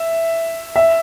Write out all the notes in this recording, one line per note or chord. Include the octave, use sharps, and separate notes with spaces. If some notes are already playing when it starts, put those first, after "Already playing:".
Already playing: E5
E5